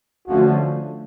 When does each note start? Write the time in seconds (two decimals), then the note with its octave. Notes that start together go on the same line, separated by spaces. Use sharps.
0.28 D3 F3 A3 C#4 F#4